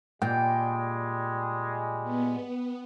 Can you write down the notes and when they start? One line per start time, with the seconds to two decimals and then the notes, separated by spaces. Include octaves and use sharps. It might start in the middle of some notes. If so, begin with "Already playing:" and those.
0.22 A#2 G3 G#3 G5
2.03 B3